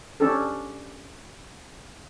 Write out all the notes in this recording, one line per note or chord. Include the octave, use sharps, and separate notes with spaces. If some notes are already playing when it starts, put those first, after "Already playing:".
C#4 D4 G4 A4